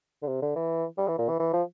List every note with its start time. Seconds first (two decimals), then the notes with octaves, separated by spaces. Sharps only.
0.22 D3
0.28 C3
0.42 D3
0.56 E3
0.98 G3
1.08 E3
1.19 A#2
1.29 E3
1.40 E3
1.53 F3